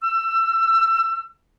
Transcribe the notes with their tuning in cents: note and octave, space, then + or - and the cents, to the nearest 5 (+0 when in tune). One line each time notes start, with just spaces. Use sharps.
E6 +25